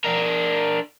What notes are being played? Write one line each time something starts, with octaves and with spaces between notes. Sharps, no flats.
D4 A#4